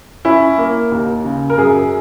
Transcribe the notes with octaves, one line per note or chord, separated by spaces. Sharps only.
C#4 E4
A#3
D#2
C#3
A#4
F#2 G#4